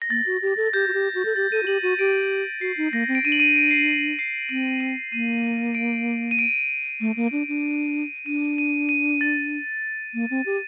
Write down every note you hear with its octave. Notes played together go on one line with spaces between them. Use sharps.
A#6
A#3 A6
F#4
G4
A4
G4 G6
F#4
G4
F#4
A4
G4 A6
A4 D#7
F#4
G4 F#7
F#4 D#7
G4 D7
F#4 C7
D#4
A#3 A#6
C4
D7
D4 D#7
F#7
D#7
D7
C7
C7
C4 D7
F#7
D#7
A#3 D#7
D7
D#7
D7
A3
A#3
D4
D4
D4 D#7
D#7
D#7
A6
A#3
C4
G4